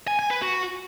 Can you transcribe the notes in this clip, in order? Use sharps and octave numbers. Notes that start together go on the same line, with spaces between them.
G#5
G#5
B4
F#4